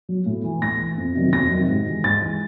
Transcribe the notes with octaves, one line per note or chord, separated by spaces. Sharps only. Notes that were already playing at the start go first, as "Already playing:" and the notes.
F#3
A2
E3
A2 A#6
E3
F2
C3 D#3 F#3
F2 A#6
C3 D#3 F#3
G#2
E3
G#2 A6
E3